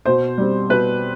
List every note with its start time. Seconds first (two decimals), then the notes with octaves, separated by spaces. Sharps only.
0.06 B2 C5
0.38 G3 C4
0.70 B2 B4